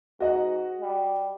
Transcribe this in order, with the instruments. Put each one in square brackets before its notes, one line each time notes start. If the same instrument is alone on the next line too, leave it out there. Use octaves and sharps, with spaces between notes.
[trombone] G#2 [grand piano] F#4 D#5 F#5
[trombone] G3